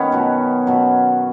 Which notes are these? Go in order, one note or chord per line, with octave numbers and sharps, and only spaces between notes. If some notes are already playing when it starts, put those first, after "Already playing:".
Already playing: D#3 B3 C#4
B2 F#3
B2 F#3